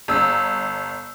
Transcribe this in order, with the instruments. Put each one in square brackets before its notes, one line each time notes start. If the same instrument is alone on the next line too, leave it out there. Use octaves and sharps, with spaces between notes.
[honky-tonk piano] G1 E6